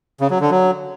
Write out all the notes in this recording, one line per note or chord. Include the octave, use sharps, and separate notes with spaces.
C#3
F#3
D3
F#3